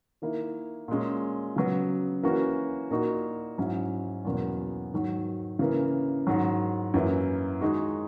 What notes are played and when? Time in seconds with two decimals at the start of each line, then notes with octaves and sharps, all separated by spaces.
0.22 D#3 A#3 E4
0.88 A#2 G#3 C#4
1.56 C#3 F#3 B3
2.23 E3 A#3 C#4 F#4
2.91 A#2 A#3 D#4 F#4
3.58 G#2 F#3 C#4 E4
4.25 E2 B2 F#3 A#3 C#4
4.92 G#2 D#3 F#3
5.59 C#3 E3 A#3
6.27 G#2 D#3 F#3
6.94 F#2 E3 A#3 E4
7.61 D#3 G#3 D#4 F#4